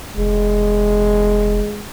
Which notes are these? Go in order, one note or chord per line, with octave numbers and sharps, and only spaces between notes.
F1 G#3